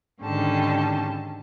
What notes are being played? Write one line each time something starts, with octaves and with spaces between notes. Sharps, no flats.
G#2 D3 D#3 C#4 G4 A5